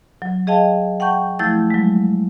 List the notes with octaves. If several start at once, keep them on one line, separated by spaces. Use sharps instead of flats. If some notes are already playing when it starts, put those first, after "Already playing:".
F#3
G#4 D#5 F5 G5 A5
F#5 G5 A5 C#6 G6
F3 A3 E4 G6 A6
F#3 G#3